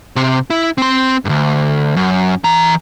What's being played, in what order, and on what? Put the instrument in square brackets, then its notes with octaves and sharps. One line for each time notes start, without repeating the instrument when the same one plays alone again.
[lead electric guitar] C3 C4
E4
C4 C6
D2 G2
F#2
E3 A#5